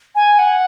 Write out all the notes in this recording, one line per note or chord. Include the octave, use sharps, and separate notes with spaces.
G#5
F#5